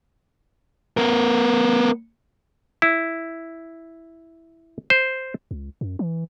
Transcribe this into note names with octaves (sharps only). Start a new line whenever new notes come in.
B3 A#4
E4
C5
C#2
F#2
E3